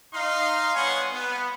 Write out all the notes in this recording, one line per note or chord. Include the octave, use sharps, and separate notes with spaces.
D#4 F5 C6
G3 B3 C#5 F#5 G#5 C6
B3